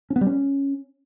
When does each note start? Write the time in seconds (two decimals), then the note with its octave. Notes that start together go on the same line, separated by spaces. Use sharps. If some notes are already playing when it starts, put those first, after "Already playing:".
0.10 C#4
0.16 B3
0.21 G3
0.27 C#4